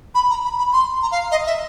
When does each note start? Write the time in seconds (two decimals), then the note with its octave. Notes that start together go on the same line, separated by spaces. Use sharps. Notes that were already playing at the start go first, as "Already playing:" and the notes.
0.15 B5
0.30 A#5
0.44 B5
0.58 B5
0.73 C6
1.02 A#5
1.12 F5
1.31 D#5
1.46 E5